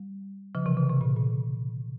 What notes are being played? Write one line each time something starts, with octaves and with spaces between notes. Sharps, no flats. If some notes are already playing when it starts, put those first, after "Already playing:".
Already playing: G3
C#3 F3
C3 E3
C#3
C3
A#2
A#2